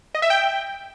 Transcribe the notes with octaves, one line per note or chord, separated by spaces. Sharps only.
D#5
E5
G5